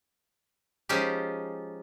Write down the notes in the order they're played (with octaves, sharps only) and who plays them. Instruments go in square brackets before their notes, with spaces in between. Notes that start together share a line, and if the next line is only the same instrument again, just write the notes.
[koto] F3 G#3 C#4 D#4 F4 G4